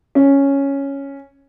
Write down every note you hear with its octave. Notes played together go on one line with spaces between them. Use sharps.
C#4